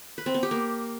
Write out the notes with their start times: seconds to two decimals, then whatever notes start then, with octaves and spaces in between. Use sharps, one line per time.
0.18 B4
0.26 C4
0.34 B3
0.43 G4
0.51 A#3